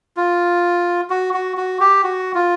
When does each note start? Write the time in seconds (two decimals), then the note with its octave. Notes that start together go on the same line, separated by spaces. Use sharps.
0.17 F4
1.10 F#4
1.34 F#4
1.57 F#4
1.80 G4
2.04 F#4
2.35 F4